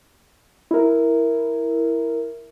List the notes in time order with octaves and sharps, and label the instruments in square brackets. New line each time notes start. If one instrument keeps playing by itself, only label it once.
[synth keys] E4 A#4